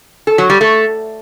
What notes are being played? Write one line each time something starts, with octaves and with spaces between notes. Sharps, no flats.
A4
F#3
G3
A3